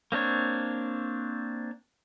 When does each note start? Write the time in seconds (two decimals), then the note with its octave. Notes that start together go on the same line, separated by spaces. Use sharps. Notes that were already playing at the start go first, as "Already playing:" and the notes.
0.12 A#3 C4 D4 C#5